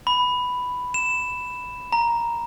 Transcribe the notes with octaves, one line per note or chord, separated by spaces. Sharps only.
B5
E7
A#5